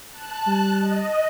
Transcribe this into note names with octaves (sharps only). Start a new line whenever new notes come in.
A5 F#6
G3
D#5